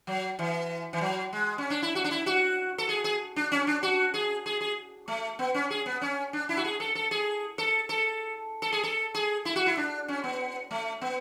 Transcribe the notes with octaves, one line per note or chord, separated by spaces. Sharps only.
F#3
E3
E3
F#3
G#3
C#4
D4
E4
F#4
D4
E4
F#4
A4
G#4
G#4
D4
C#4
D4
F#4
G#4
G#4
G#4
A3
B3
C#4
G#4
B3
C#4
D4
E4
F#4
G#4
A4
A4
G#4
A4
A4
A4
G#4
A4
G#4
E4
F#4
E4
D4
C#4
B3
A3
B3